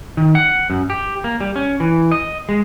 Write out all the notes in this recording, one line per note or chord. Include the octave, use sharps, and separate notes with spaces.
D#3
F#5
F#2
G4
A#3
G3
C#4
E3
D#5
G#3